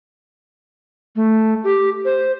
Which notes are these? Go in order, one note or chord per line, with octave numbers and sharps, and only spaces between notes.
A3
G4
C5